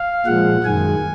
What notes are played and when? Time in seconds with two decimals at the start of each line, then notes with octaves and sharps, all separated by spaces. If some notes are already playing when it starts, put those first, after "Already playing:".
Already playing: F5
0.26 A#2 F3 G#3 F#5
0.64 F#2 D#3 G#3 G#5